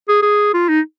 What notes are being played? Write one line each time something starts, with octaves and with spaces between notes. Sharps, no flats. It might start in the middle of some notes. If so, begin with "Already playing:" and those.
G#4
G#4
F4
D#4